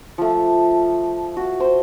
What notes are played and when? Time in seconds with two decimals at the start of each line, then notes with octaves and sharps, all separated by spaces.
0.18 F3 A3
1.37 F#4
1.60 C5